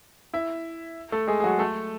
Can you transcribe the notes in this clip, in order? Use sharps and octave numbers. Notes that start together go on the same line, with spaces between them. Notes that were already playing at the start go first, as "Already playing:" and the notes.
E4 E5
A3 A4
G#3 G#4
G#4
F#3 F#4
A3 A4